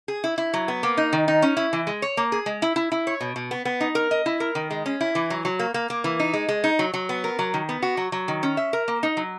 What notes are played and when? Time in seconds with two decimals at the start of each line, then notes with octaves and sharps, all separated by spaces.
0.08 G#4
0.24 E4
0.38 E4
0.54 F#3
0.68 B3
0.83 A#3
0.97 D#4
1.13 D#3
1.28 D#4
1.42 C#4
1.57 E4
1.73 E3
1.87 G#3
2.02 C#5
2.17 A#3
2.32 G#4
2.46 G#3
2.62 E4
2.76 E4
2.92 E4
3.07 C#5
3.21 B2
3.36 B2
3.51 B3
3.65 B3
3.81 D#4
3.95 A#4
4.11 D#5
4.26 E4
4.40 A#4
4.55 D#3
4.71 G#3
4.86 C#4
5.01 E4
5.15 E3
5.30 F#3
5.45 F#3
5.59 A#3
5.74 A#3
5.90 A#3
6.04 E3
6.20 D#4
6.34 G#3
6.49 G#3
6.64 D#4
6.79 F#3
6.94 F#3
7.09 B3
7.24 A#4
7.39 F#3
7.54 D#3
7.69 B3
7.82 F#4
7.97 F#3
8.12 F#3
8.28 D#3
8.43 C#4
8.57 E5
8.73 A#4
8.88 A#3
9.03 D#4
9.17 F#3